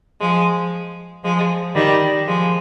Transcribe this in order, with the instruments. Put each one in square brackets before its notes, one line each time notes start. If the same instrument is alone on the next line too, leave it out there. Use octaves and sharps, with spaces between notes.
[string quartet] F3 G#3
F3 G#3
D#3 G3
F3 G#3